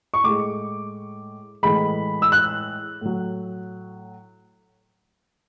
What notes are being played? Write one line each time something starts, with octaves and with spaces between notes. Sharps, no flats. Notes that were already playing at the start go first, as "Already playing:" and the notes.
C#6
A2 G#3 D6
A2 E3 G#3 B5
E6
F#6
A2 F#3